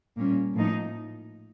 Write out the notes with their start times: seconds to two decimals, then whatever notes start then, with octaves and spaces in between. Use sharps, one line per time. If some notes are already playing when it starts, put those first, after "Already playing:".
0.18 A#2 G3 A#3 C#4
0.54 A2 F3 A#3 D#4